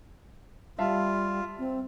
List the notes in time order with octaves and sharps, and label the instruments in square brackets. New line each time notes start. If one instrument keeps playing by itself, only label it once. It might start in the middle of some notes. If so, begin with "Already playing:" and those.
[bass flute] G3 [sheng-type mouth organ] F4 [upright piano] E5 F5 A5
[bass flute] C4